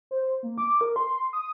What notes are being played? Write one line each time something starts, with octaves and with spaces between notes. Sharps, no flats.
C5
A#3
D6
A#4
C6
D#6